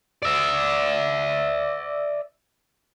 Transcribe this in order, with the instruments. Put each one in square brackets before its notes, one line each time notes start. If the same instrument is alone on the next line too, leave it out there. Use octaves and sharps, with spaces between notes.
[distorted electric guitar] D5 E5